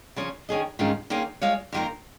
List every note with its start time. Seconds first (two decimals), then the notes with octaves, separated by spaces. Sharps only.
0.16 C#3 F3 C#4
0.49 D#3 C#4 G#4 D#5
0.79 G#2 D#3 G#3 C#4 F4
1.10 D#3 A#3 C#4 F4 G#4
1.41 G#3 F4 C#5 F5
1.73 F2 D#3 A#3 F4 A#4